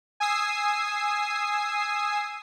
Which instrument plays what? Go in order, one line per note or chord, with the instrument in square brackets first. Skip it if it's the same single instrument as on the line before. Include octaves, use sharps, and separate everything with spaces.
[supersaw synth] G#5 D#6 E6 C7